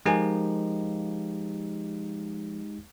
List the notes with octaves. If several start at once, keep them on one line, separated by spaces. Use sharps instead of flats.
F3 G#3 D#4 G4 A#4 G#5